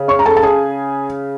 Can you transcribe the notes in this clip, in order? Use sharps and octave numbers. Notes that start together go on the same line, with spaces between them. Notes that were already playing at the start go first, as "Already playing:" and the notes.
Already playing: C#3
C#5 C#6
A#5
A4 A5
A5
G#4 G#5